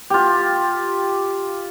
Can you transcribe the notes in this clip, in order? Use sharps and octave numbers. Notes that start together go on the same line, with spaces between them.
F4 G4